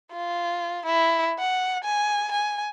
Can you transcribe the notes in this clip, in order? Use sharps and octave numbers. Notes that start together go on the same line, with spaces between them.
F4
E4
F#5
G#5
G#5